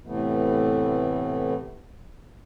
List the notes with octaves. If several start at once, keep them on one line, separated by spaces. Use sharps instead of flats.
A2 C3 E3 A3 B3